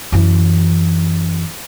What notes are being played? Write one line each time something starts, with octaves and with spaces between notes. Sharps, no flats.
F#2 E3